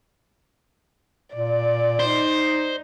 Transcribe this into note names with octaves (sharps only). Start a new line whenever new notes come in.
A#2 D5
D#4 C5